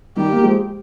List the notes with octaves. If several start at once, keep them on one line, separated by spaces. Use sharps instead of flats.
D#3 G3 G4
A#3
F3 G#3